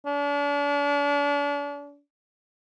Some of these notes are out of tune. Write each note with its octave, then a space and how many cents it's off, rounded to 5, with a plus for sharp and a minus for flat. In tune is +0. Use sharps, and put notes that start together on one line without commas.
D4 -40